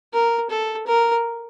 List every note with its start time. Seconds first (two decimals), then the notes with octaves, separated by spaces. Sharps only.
0.14 A#4
0.50 A4
0.87 A#4